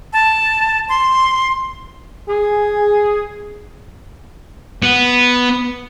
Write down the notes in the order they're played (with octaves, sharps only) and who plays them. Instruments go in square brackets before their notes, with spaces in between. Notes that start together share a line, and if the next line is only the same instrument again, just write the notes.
[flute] A5
C6
[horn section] G#4
[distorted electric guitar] B3